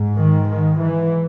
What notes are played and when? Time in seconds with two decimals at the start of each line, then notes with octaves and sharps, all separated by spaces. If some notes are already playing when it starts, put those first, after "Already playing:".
Already playing: G#2
0.19 D#3
0.50 D#3
0.83 E3